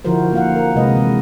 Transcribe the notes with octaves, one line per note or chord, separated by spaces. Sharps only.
D3 F3 E4 F#4 A#4 C5
A#3 F5 F#5
A#4
C3 G#3 B4 D#5
E3 G#3